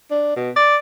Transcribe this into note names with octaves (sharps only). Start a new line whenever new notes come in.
D4
B2
D5